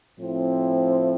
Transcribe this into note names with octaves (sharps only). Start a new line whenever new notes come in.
A2 F3 C4 E4